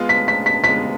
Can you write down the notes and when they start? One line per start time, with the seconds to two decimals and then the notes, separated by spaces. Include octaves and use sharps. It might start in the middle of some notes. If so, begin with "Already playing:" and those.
Already playing: G#3 B3 F4
0.09 B6
0.28 B6
0.46 B6
0.64 F4 B6
0.67 G#3 B3